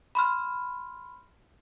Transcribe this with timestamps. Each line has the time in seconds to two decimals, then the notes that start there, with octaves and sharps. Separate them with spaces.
0.15 B5 C6 F6